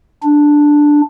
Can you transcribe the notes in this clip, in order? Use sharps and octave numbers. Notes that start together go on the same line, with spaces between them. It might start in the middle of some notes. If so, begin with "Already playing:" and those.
D4